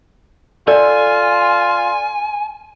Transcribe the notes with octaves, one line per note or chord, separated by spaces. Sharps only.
F4 A4 D5 E5 G#5